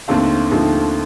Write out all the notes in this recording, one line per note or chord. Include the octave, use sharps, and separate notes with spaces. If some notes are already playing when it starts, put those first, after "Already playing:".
D#2 D3 A3 C4 F5 A5
D#2 D3 F3 A3 C4